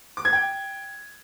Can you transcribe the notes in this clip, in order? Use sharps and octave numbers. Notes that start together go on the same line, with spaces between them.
D6
G#6
G5